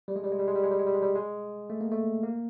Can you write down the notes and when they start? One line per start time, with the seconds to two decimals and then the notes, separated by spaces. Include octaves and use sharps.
0.08 G3
0.16 G#3
0.24 G3
0.32 G#3
0.39 G3
0.47 G#3
0.55 G3
0.64 G#3
0.71 G3
0.79 G#3
0.86 G3
0.94 G#3
1.03 G3
1.16 G#3
1.70 A3
1.81 A#3
1.91 A3
2.23 A#3